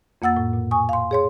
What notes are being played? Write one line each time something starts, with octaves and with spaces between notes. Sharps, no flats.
F2 A#3 F#5 E6 A6
A2
A#2
G#5 C#6 D#6
F5 C6
G#4 C#5 C6